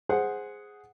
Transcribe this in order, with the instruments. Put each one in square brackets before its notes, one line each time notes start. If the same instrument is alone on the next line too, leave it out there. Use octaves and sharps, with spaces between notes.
[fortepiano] G#4 C5 F#5